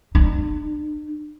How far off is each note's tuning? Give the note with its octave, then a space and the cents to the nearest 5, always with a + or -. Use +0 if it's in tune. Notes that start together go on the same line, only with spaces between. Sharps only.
D4 +40